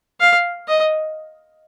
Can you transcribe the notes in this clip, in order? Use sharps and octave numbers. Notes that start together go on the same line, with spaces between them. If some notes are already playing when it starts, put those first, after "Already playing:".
F5
D#5